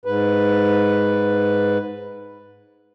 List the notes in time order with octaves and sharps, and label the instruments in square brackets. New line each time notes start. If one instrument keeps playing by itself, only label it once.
[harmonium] G#2 B4